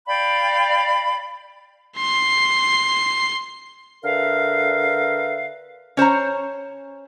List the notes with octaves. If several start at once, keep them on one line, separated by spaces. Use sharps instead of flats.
D5 F5 G5 B5
C6 C7
D3 A#4 B4 E5 F5
C#4 C5 C#5 A#5